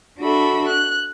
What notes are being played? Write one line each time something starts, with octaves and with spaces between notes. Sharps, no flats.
D4 F#4 A4 E5 B5
F#6